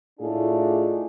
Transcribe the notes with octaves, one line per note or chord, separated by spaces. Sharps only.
A2 A3 D4 D#4 F4 G#4